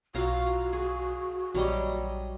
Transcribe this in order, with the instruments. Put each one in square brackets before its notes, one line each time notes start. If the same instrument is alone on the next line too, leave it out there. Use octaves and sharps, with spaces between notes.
[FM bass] B1 [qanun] F4 F5 A#5 [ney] F#4
[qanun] G#4
[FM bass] A#1 [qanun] F#3 G3 D#5